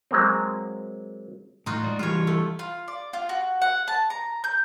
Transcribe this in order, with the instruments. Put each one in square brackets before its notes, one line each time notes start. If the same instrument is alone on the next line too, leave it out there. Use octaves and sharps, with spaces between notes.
[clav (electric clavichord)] F#3 G#3 A#3 C4
[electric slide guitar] A2 [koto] D#4 F4 F#4
[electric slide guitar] G#3 D5
[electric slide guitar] E3 G3 [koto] F4 C#5
[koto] A3
[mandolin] F4
D5
F4
F#4
F#5
A5
A#5
G6